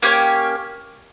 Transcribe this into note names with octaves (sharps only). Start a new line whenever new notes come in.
A#3 C#4 G4 C#5